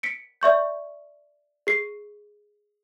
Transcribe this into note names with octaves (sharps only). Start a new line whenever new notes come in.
B6 C#7 D7
D5 E5 C#6 G6
G#4 C7